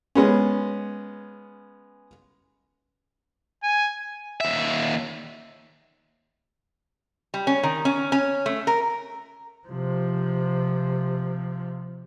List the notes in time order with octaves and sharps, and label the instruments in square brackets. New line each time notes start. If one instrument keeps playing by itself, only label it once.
[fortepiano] G#3 B3 C#4
[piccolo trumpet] G#5
[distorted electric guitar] D#2 E5
[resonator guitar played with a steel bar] G3
C#4
D#3
C#4
C#4
A3
A#4
[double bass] C3 F3